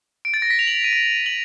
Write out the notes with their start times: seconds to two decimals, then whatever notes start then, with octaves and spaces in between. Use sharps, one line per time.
0.25 D7
0.34 A6
0.42 A#6
0.50 B6
0.59 F7
0.67 F#7
0.75 F7
0.84 D#7
0.93 D7
1.26 F#7